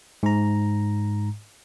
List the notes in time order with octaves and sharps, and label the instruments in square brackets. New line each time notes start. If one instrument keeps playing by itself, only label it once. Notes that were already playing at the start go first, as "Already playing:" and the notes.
[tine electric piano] G#2 A#5